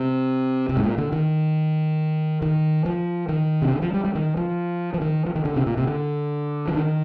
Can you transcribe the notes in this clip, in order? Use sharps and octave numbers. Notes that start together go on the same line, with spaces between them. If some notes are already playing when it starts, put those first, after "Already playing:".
Already playing: C3
C3
G#2
A#2
D3
D#3
D#3
F3
D#3
C3
D3
F3
G3
G3
D#3
F3
F3
D#3
F3
D#3
D3
C3
A#2
C3
D3
F3
D#3